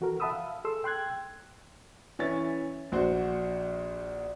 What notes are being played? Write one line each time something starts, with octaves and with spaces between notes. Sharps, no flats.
E3 F#4 A4 A#4
E5 F#5 A5 B5 D#6 E6
F5
G#4 A4 C6 E6
G5 C6 F#6 G#6
E3 C#4 E5 A6
A#1 F#4 C5